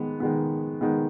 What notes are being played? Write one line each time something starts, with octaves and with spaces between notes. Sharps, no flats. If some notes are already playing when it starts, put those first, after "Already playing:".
Already playing: D#3 G#3 B3
D#3 G#3 B3
D#3 G#3 B3